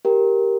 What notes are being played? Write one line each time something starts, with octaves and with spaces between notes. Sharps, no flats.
G4 A#4